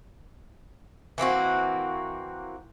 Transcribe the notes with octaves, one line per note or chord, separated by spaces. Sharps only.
E3 A#3 C4 F#4